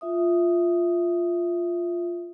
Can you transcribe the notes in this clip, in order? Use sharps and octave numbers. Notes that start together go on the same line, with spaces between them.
F4 E5 D#6